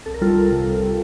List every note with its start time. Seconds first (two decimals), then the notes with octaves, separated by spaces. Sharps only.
0.06 C2 A4
0.14 A#4
0.21 G3 F4 A4
0.36 C2
0.51 C3
0.67 C2
0.82 G3